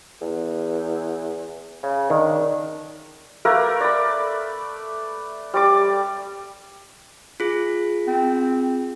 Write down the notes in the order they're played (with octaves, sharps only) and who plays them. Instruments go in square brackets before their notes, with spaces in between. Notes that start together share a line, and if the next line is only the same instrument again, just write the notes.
[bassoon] E2
C#3
[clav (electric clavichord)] D#3 [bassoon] D4
[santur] A3 A#3 A#4 B4
D5 B5
G3 D5 D6
[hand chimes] F4 G#4
[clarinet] C4